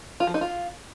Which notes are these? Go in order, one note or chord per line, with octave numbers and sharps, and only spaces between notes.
F4
F3
D#4
F4